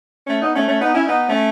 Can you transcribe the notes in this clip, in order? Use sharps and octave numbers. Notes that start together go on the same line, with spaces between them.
A3 C#4
B3 D#4
A3 C#4
A3 C#4
B3 D#4
C#4 E4
B3 D#4
A3 C#4